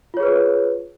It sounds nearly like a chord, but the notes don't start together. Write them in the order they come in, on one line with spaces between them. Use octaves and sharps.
F4 C#5 G#4 B4